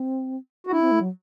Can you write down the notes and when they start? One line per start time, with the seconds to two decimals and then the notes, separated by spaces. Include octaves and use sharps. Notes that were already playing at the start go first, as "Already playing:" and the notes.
Already playing: C4
0.67 F#4
0.72 D4 E4
0.81 C4
0.92 A3
1.01 F#3